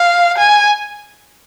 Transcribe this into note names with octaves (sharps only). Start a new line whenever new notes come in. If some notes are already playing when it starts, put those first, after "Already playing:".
Already playing: F5
G#5